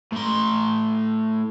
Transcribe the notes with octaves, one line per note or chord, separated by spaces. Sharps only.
A2 C6